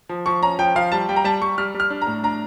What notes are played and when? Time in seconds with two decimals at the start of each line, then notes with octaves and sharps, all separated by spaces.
0.09 F3
0.26 F3 C#6
0.42 C#4 A#5
0.59 F3 G5
0.75 F3 F5
0.92 G3 A5
1.09 G3 G5
1.16 A#5
1.24 G3 A5
1.42 G3 C#6
1.58 G3 F6
1.74 G3
1.80 F6
1.90 D4
2.02 A#5
2.07 A2
2.23 D4 A#5